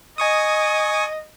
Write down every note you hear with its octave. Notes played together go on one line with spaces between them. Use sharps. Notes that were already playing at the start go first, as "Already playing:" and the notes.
D#5 G#5 C#6 D#6